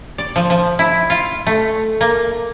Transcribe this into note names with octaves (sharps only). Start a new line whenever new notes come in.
D5
F3
F3
E4
F4
A3
A#3